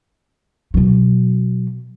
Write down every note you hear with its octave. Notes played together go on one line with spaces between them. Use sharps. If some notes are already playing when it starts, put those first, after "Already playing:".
B2 F#3